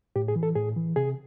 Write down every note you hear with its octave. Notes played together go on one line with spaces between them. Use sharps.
A2 G4
G#4
E3
A4
A2 G#4
E3
C3 G#4